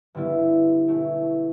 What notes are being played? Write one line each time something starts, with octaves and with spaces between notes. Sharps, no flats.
G2 D3 G3 B3 E4
B1 B2 A3 E4